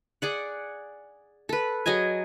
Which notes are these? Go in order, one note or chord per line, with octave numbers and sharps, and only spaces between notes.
G#4 D5 F#5
A4 B4
F#3 G#4 D#5 G#5